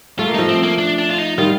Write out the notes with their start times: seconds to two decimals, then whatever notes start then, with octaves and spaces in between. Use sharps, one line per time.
0.19 A3 F4
0.28 A#3
0.34 F3 A3 D#4
0.49 C4
0.63 A#3
0.78 D4
0.98 D4
1.10 F4
1.18 D#4
1.38 D#3 G3 F4